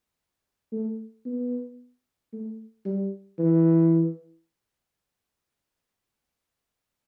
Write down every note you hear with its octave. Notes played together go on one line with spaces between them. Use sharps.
A3
B3
A3
G3
E3